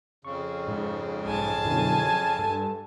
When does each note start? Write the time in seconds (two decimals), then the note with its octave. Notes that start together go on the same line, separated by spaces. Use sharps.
0.25 F2 C#3 C#6
0.68 G#2
1.25 B1 G#5 A5
1.65 F#2 B2 D3 E4
2.00 G#6
2.39 G2 A4